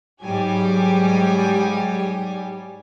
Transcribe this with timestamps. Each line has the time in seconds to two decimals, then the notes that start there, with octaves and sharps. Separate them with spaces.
0.23 G#2 F#3 G3 G4 G#5